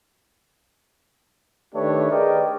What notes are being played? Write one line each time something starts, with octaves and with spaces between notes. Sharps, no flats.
D#3 A3 D4 G4 B4 C#5
G#4 A#4 B4 D5 D#5 G5